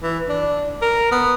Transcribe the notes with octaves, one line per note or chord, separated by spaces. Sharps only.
E3
D4
A#4
B3